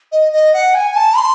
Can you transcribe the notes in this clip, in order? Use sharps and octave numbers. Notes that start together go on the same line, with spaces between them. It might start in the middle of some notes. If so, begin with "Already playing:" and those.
D#5
D#5
F#5
G#5
A5
C6